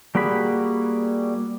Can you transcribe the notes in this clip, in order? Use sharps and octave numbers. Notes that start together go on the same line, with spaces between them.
G3 A#3 F#4 G#4 B5